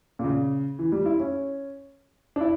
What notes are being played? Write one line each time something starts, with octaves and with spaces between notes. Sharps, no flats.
A#2
C#3
E3
G3
E4
C#4
D4
E4